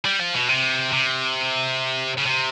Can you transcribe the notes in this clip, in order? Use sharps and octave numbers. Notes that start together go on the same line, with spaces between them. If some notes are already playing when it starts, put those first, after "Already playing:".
G3
F3
B2
C3
C3
C#3
C3